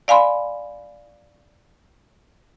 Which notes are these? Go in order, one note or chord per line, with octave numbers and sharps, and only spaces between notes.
D5 F5 G#5 B5 C6